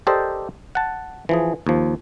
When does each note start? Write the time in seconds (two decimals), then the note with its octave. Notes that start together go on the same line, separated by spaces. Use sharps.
0.07 G4 A4 A#4 C5 D5 D#5
0.75 F#5 A5
1.29 E3 F3 G#4
1.67 D#2 F3